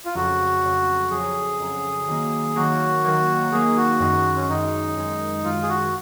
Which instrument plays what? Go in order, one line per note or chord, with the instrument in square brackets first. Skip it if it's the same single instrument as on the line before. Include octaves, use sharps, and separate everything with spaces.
[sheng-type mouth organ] F4
[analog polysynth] F2 C#3 F#3 [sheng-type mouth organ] F#4
[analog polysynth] F2 C#3 F#3
[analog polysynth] F2 C#3 F#3 [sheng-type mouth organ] G#4
[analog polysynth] F2 C#3 F#3
D#3 F#3 A#3
[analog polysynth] D#3 F#3 A#3 [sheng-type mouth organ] F#4
[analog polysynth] D#3 F#3 A#3
[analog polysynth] D#3 F#3 A#3 [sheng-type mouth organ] G#4
[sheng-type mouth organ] F#4
[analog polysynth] F#2 D#3 G#3
[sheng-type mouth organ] C#4
[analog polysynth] F#2 D#3 G#3 [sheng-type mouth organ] D#4
[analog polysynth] F#2 D#3 G#3
[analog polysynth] F#2 D#3 G#3 [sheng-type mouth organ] F4
[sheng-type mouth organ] G#4
F#4